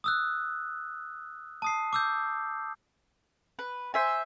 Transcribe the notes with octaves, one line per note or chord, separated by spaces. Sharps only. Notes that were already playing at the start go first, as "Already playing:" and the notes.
D#6 E6 F#6
A5 D#6 C7
D6 E6 G6
B4
C5 E5 G#5